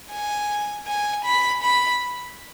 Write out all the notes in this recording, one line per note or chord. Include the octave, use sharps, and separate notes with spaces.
G#5
G#5
B5
B5